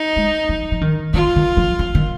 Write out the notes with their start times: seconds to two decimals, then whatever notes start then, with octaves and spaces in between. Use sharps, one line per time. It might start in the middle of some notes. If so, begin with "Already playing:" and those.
Already playing: D#4
0.16 G#3
0.49 F3
0.72 F3
0.81 D#3
1.14 D#3 F4
1.36 D#3
1.57 F3
1.79 F3
1.95 D#3